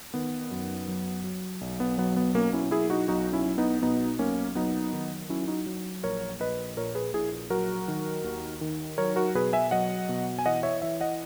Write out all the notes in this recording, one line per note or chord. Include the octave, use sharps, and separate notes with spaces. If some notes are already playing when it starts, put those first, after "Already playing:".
D#3 B3
F#2
F#3
F#3
B1
B3
F#3 B3
B3
B2 A#3 C#4
C#4 E4
F#3 E4 G#4
D#4 F#4
B1 D#4 F#4
C#4 E4
B1
B3 D#4
B2 B3 D#4
B1 A#3 C#4
F#3 B3 D#4
D#3
F#3 C#4 E4
D#4 F#4
F#3
A#1 A#4 C#5
A#1 B4 D#5
A#2 A#4 C#5
G#4 B4
A#1 E4 G#4
F#3 F#4 A#4
D#3
D#2
D#3
F#3 A#4 C#5
F#4 A#4
B2 G#4 B4
E5 G#5
F#3 D#5 F#5
B2
G#5
E3 D#5 F#5
C#5 E5
E3 C#5 E5
D#5 F#5